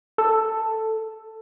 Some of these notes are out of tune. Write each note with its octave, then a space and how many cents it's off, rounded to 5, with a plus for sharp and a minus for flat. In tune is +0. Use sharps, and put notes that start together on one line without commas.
A4 +5